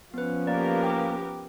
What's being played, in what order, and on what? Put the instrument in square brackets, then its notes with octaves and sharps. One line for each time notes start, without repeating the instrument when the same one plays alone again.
[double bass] F3 C#4 [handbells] B3 B4
[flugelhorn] A#3 [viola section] B3 G4 A#4 [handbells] D5
[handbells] G5 D6